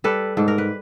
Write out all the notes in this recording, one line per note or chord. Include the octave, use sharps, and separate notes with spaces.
G3 A4 B4
G#2 A4
A#4
B4